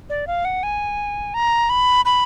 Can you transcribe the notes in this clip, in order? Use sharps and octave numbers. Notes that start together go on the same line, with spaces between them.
D5
F5
F#5
G#5
A#5
B5
B5